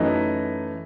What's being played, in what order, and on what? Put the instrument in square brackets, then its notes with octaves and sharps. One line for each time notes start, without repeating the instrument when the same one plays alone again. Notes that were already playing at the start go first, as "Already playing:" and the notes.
Already playing: [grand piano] F#2 E3 A3 D#4 D#5